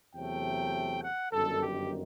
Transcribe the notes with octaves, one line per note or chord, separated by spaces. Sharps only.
E2 C3 F#3 A3 G5
F#5
G1 F#2 D#3 A4
G4